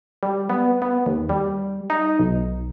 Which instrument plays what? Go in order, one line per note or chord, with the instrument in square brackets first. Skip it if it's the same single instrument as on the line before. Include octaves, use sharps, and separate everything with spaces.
[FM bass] G3
B3
B3
D#2
G3
D#4
B1